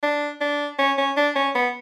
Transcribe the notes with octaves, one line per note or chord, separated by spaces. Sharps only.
D4
D4
C#4
C#4
D4
C#4
B3